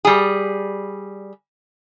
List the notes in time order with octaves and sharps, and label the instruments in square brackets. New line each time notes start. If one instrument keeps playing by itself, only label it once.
[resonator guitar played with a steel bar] G3 G#4